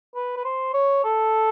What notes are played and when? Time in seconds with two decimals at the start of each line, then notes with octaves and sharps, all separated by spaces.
0.15 B4
0.37 B4
0.45 C5
0.74 C#5
1.04 A4